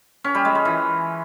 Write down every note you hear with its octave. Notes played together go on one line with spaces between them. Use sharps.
C#4
G3
G#3
G#3
E3